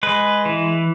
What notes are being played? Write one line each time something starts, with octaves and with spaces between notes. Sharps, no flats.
G#3 B4
E3